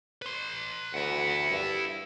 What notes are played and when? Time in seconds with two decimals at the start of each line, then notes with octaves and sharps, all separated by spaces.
0.22 B4 C6
0.94 D2 E4 F#5
1.50 G2